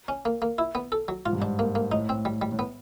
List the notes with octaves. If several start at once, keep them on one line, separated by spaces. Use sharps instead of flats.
C#4
A#3
A#3
E4
B3
A4
F#3
G#2 F4
G2
G#2 D4
A#3
A#3
A2 D#4
C4
G3
G3
A2
B3